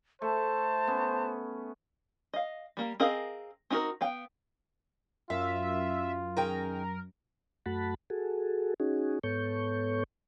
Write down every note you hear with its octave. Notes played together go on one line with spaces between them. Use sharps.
A3 C5 A5
B3 C#4
D#5 F5
G3 A#3
C4 G#4 A#4 D#5 F5
C4 D#4 F#4 A4 A#4
B3 F5 G5
F#2 F4 E5 F5
D#3 G#4 A#4 G5
F#2 A3 F#4 F#5 A5 B5
F#4 G#4 A4
C#4 D#4 F#4 G#4
G#2 B3 A4 C#5 C#6 G6